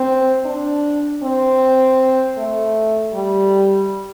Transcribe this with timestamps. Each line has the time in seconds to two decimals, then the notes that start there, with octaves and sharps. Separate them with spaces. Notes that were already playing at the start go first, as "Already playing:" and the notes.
Already playing: C4
0.46 D4
1.23 C4
2.38 A3
3.14 G3